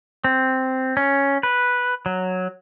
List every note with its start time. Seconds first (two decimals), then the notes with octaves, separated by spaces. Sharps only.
0.24 C4
0.97 C#4
1.43 B4
2.06 F#3